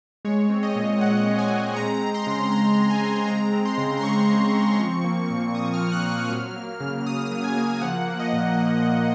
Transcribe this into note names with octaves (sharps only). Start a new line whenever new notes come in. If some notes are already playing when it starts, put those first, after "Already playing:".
G#3 C#5
C4
D#5
A#2
A#2 F#5
G#3
G#5
C4
G#3 A#5
C4
C6
C#3
C#3 A#5
G#3
G#5
C4
G#3 A#5
C4
C6
C#3
C6
C#3 C#6
G#3
C4
F3
A#3
A#2
A#2 D#6
F6
F3
F#6
A#3
F6
F#3
A#3
C#3
C#3 D#6
F#3
G#5
A#3
F3 F#5
A#3
D#5
A#2